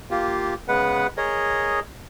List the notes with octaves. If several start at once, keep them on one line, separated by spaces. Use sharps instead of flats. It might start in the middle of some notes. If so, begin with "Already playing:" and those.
A#3 F4 G4
C#3 G#3 B3 B4 F#5
G#4 A#4 C#5 D#5